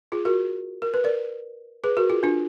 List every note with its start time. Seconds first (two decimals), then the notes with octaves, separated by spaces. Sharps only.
0.12 F4 G#4
0.25 F#4 A#4
0.82 A#4
0.94 B4
1.04 A#4 D5
1.84 G#4 B4
1.97 F#4 A#4
2.09 F4 G#4
2.23 D4 F4